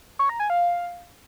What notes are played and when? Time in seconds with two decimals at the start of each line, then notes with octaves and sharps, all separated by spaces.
0.19 C#5
0.29 A#5
0.40 G#5
0.50 F5